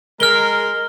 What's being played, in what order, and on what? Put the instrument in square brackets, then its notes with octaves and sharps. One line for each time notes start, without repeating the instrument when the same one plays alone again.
[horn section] G#3 A#4 [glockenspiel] F6 G7